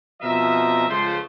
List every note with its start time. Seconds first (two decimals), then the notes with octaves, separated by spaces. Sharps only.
0.22 F2 B2 F3 A#4 D#5 E5
0.89 C#2 F3 A3 C5